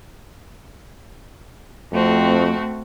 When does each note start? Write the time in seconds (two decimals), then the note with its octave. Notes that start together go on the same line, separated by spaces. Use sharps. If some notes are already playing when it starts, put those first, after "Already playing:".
1.92 F2 A3 C4 F#4